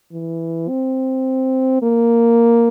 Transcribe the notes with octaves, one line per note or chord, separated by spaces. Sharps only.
E3
C4
A#3